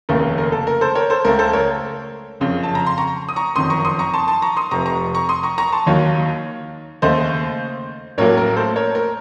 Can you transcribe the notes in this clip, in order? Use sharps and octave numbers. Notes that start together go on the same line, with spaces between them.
F1 D#2 C#3 A3 C#4 A#4
A#4
A4
A#4
A4 C5
A#4 C#5
A4 C5
C#2 C#3 A3 A#4
A4 C5
A#4 C#5
F#1 F2 C#3
A5
A#5
C6
A#5 C#6
D#6
A#5 C#6
F#1 F2 D#3 C6 D#6
A#5 C#6
C6 D#6
A#5 C#6
A5 C6
A5 C6
A#5 C#6
C6 D#6
F1 F2 C3 A#5 C#6
A#5 C#6
A#5 C#6
C6 D#6
A#5 C#6
A#5 C#6
A5 C6
D#2 D#3 F#3 C#5 F5
D#2 C#3 A3 C5 D#5
A1 A2 F#3 A#3 A#4 C#5
A#4
A4 C5
A#4 C#5
A#4